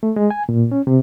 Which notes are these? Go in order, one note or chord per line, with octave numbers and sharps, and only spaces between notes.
A3
G#3
G#5
A#2
C#4
C3